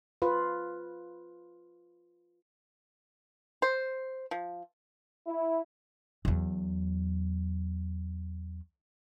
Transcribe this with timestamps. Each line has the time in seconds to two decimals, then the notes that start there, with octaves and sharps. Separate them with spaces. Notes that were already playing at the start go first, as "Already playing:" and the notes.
0.22 F4 B4
3.62 C5
4.31 F3
5.26 E4
6.25 E2 F#3